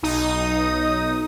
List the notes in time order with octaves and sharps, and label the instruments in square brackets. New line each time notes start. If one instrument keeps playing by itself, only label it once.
[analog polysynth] B1 D#4 D#6